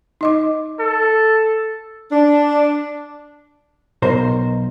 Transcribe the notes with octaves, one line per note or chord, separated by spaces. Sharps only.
D#4 D#5 D6
A4
D4
B1 B2 A#4 C5